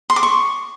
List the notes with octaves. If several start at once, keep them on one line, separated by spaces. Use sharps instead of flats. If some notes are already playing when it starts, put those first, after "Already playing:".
C6
D6
C#6